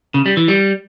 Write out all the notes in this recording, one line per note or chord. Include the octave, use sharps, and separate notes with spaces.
C#3
G3
E3
G3